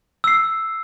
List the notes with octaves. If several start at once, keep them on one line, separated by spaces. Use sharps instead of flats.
E6 C7